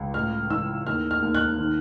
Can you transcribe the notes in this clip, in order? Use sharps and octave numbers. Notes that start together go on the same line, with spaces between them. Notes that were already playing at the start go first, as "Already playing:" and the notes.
Already playing: C#2
A2 F6
E3 E6
D#2 F6
F6
D#2
F#6
D#3